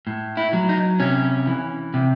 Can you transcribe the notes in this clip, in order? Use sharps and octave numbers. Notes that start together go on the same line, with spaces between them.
A2
E4
F#3
D#4
C3 C#4
E3
C3